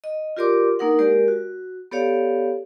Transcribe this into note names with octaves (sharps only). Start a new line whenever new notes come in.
D#5
F4 G4 A#4 D5 C6 D6
A#3 D4 D#4 A#4 B4 F#5
G#3 G4 A#4 D5
F#4
B3 G4 A4 C#5 D5 F5